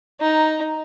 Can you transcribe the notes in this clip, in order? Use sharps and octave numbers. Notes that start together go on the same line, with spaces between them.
D#4 A#5